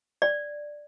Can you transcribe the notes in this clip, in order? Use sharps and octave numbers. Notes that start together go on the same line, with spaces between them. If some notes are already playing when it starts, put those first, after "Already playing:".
D5